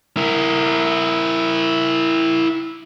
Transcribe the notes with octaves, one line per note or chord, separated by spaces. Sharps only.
E4 A#4